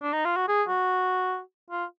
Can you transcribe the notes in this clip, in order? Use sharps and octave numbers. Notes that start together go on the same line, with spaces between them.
D4
D#4
F4
F#4
G#4
F#4
F4